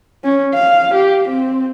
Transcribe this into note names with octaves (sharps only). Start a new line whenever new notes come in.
C#4
F5
G4
C4